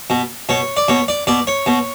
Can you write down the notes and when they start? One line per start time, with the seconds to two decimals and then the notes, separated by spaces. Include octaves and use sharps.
0.10 B2
0.49 B2 C#5
0.77 D5
0.88 B2 C#5
1.08 D5
1.27 B2 D5
1.47 C#5
1.66 B2